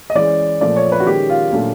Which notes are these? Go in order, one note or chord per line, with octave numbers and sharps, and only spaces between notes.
D#5
E3 G#3 C#4 D5
A#2 F3 A3 D5
C#5
B4
F#4
D#3 G#3 C#4 G4
F4
A#2 F#3 A3 D4 F4